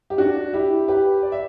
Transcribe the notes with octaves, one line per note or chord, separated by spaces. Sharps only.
G4
D4 F#4
E4 G4
G4 B4
D5
E5